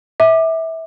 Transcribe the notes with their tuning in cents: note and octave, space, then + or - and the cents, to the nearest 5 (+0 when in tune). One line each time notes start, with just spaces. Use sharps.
E5 -25 D6 +20